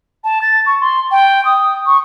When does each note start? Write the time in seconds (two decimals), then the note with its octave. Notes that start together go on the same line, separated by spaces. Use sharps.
0.24 A5
0.42 A6
0.66 C#6
0.81 C6
1.11 G5
1.45 D#6
1.86 C#6